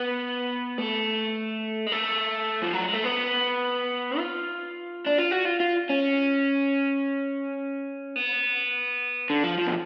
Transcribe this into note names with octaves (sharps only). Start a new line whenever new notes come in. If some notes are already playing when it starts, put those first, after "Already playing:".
Already playing: B3
A3
G#3
A3
F3
F#3
G#3
A3
B3
F4
D4
F4
F#4
F4
F4
C#4
B3
D3
F3
F3
B2